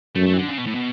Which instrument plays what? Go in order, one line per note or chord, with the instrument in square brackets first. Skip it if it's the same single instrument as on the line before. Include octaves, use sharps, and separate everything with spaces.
[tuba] F#2 [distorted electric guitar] A3
[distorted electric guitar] A3
E3
D3
C#3
B2
A2
B2